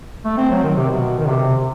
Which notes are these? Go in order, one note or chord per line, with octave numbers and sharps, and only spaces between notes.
A3
C4
F#3
D#3
C3
B2
D#3
C3